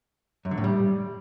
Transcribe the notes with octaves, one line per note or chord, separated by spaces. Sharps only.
F#2
D3
A2
G3